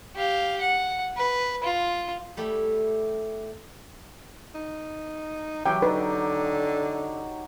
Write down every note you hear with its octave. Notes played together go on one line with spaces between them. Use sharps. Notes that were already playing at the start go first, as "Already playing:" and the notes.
G4 F5
F#5
B4
F4
G3 A3 E4 G4
D#4
E3 F#3 G4 G5
D3 D#4 B4